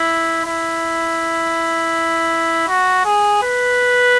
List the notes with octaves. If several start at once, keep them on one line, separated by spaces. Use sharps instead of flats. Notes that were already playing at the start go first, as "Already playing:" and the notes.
Already playing: E4
E4
F#4
G#4
B4